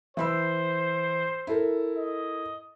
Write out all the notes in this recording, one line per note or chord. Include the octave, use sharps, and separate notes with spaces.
E3 C5 B5 E6
E4 A4 A#4
D#5